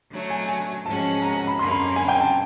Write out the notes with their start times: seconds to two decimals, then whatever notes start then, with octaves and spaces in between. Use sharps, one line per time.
0.12 D3 F#3 A3
0.30 G#5
0.48 G#5
0.85 G#2 F3 G#3 C#4 F#4 A5
1.22 A#5
1.35 A#5
1.47 B5
1.59 F#2 D3 F#3 A#3 C#4 C6
1.71 B5
1.96 G#5
2.09 G5
2.21 A5